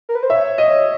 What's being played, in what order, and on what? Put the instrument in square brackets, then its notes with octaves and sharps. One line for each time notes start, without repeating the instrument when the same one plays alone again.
[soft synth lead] A#4
B4
C5
[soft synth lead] C#5 [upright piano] E5
[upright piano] D#5